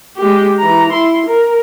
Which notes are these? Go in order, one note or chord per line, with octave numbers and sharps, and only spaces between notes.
G#3 G4
E3 A#5
E4 C6
A#4